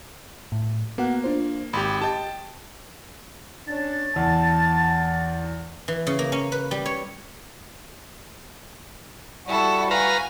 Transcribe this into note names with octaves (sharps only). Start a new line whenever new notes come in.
A2
A#3 B3 F#4 F#5
D4 F4 C5
G#1 G4 B5 C6
G4 D#5 G5 A5 A6
C#4 D4 C#5 A6
E2 A5
E3
C#3
A#3
C#4
B4
G3
C#5
G3 E4 F#4 A4
B4 F5 G#5 A#5